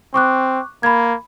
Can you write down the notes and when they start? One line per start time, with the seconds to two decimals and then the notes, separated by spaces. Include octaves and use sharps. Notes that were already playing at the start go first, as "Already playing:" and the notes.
0.14 C4 C#6 D6 F#6
0.83 A#3 B5 G#6